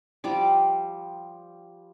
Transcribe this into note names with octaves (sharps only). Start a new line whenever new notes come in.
F3 G3 D5 D6